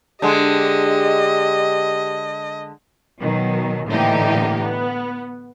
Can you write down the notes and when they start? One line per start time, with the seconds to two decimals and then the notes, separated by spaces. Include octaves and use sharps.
0.22 D3 G#3 G4 D#5
3.20 B2 D#3 F#3
3.88 A2 D3 E3 A#3 D#4 G4
4.61 B3